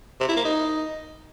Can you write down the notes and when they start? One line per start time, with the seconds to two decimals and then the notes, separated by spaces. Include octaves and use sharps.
0.20 C3
0.28 E4
0.37 A#3
0.45 D#4